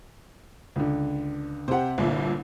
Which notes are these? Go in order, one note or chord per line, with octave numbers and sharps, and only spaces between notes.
C#2 D3
C3 G4 C5 F#5
G1 C2 A#2 E4